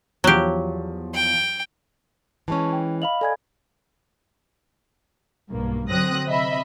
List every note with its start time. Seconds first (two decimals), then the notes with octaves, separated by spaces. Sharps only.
0.24 E2 F3 F#3 G4
1.15 G5
2.48 E3 G#3 C#4 A5 C#6
2.72 G5
3.02 D#5 F5 B5 F7 F#7
3.21 A4 D5 G#5 G#6
5.50 B1 G2 A#3
5.89 D3 F#3 C4 D#6 F#6 A#6
6.27 C3 D#5 E5 B5